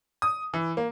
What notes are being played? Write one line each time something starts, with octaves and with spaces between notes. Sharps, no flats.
D#6
E3
A#3